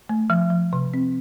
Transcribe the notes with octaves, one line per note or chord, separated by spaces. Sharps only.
A3
F3
F3
C3
C4